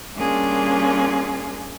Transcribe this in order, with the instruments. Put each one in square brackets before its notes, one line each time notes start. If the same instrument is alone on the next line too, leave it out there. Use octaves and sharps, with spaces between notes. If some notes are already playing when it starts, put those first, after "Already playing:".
[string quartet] G3 A#3 C#4 D4 F4 G#4